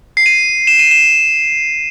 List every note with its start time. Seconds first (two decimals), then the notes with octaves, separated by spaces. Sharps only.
0.17 C7
0.26 D#7
0.67 E7
0.79 D#7
0.91 E7